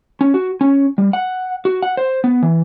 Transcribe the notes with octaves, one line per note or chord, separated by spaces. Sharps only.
C#4
F#4
C#4
G3
F#5
F#4
F#5
C5
B3
E3